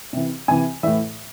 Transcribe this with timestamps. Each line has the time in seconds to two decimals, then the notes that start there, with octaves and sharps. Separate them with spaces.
0.13 C3 E3
0.48 C3 E3 G#5
0.83 A2 E3 E5